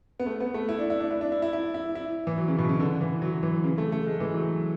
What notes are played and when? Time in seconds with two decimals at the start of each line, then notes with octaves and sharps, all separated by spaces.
0.20 B3
0.26 A3
0.40 B3
0.54 A3
0.69 E4
0.79 D4
0.90 E4
1.00 D4
1.11 E4
1.21 D4
1.32 E4
1.42 E4
1.53 E4
1.74 E4
1.95 E4
2.27 E3
2.38 F#3
2.48 C#3
2.58 B2
2.69 C#3
2.80 D3
3.01 E3
3.22 F#3
3.43 E3
3.64 C#3
3.78 A3
3.92 A3
4.06 G#3
4.20 E3
4.34 F#3